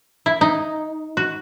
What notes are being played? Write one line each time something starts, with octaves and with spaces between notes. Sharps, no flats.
E4
D#4
F#4